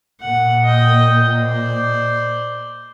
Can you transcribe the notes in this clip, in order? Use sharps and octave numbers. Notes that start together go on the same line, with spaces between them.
A#2 F#5
D#5 G5
C5 D5